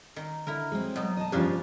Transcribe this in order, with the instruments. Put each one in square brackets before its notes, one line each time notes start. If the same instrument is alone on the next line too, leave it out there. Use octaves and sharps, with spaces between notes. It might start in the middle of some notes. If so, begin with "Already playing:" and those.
[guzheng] D#3
[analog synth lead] D3 [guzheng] E4 A#4
[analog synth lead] F#3 [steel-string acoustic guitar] G#3 C4
[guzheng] B2 D#4
[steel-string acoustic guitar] D#5 A5
[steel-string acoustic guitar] G2 F3 [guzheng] C#3 C#4 D4 [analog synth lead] G4